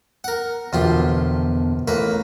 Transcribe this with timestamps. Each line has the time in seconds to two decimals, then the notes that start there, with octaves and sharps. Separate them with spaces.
0.24 A#4 F#5
0.73 A#1 E2 B2 D3 F4 G4
1.88 A1 A#3 B4